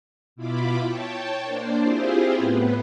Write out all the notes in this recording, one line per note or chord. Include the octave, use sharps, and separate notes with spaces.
B2 E4 F4 B5 D6
C#5 G5 A5
A#3 D4 C5 D5
C4 E4 F4 G4 G#4 C5
A2 B3 B4